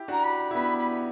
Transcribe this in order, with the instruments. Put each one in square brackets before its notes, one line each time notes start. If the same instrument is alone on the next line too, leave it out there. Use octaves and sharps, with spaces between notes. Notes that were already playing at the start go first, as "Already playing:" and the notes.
Already playing: [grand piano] E4 G4
[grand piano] D4 F#4 [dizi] A#5
[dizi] B5
[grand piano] E4
[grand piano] B3 D4 [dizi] B5
[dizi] B5